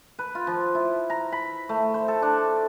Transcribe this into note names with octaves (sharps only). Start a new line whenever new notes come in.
B4
F4
F3
E4
A#5
B5
A3
C5
A4
D4